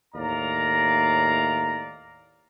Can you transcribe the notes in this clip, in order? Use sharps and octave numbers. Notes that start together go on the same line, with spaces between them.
D#2 A2 D5 F5 A#5